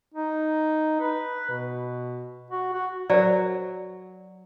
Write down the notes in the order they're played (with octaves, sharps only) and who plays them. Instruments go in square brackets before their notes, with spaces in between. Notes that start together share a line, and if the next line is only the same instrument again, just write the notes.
[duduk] D#4
B4
B2
F#4
F#4
[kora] F#3 [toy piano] A#4 C5 D5